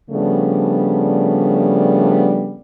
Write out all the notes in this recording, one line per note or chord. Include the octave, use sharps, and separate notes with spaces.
C#3 F3 G3 A3 B3 D4